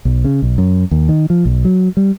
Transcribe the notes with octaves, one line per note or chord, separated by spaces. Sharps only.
B1
C#3
B1
F#2
D#2
D#3
F3
B1
F#3
G3